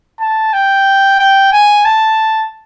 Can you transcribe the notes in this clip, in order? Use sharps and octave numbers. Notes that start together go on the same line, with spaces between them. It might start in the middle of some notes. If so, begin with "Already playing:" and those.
A5
G5
G5
G#5
A5